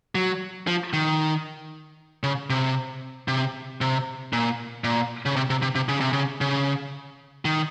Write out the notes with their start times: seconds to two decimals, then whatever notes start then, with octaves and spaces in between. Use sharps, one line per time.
0.15 F#3
0.67 F3
0.93 D#3
2.23 C#3
2.50 C3
3.28 C3
3.81 C3
4.33 A#2
4.84 A#2
5.26 C#3
5.36 C3
5.50 C3
5.62 C3
5.75 C3
5.88 C#3
6.00 C3
6.13 C#3
6.41 C#3
7.45 D#3